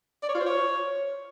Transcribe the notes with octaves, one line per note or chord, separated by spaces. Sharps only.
D5
C#5
F4
C5
C#5